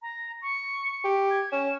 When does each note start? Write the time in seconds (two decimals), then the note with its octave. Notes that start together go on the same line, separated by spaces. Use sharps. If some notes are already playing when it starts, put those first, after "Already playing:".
0.02 A#5
0.42 C#6
1.04 G4
1.30 G#6
1.52 C#4 E7